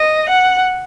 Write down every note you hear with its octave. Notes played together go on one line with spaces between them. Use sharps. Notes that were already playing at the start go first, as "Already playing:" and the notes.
Already playing: D#5
F#5